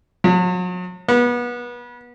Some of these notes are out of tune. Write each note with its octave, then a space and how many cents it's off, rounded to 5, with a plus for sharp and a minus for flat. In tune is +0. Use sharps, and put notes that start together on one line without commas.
F#3 -40
B3 -30